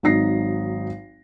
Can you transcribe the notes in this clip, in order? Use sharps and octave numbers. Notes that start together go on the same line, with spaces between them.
G#1 F#3 D#4 A#6 C7